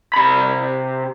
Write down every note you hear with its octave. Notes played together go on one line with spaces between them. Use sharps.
C3 B5